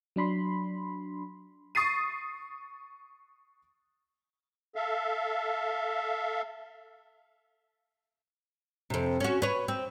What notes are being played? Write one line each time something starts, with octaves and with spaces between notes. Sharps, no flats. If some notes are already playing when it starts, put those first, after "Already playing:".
F#3 D4 B5 C6
C#6 D#6 A6 C7 D#7
A4 E5 F5
F2 C3
C#4 F#4
B4 C#5
C4